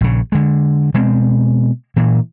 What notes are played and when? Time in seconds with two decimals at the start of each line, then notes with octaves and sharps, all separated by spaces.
0.01 A#1 C#3
0.32 D3 G#3
0.94 B2 G#3 C4
1.96 A#2 E3